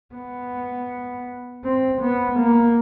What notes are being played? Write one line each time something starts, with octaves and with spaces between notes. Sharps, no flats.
B3
C4
B3
A#3